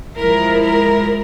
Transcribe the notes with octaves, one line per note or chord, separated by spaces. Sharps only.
F3 G#3 E4 A#4
A#4